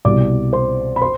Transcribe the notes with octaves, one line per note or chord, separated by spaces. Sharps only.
C2 B2 G3 D5 D6
C5 C6
B5
C5 C6